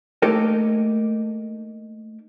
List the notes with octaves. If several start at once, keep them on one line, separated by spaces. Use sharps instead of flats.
A3 A#3 D#4 G4 A4 A#4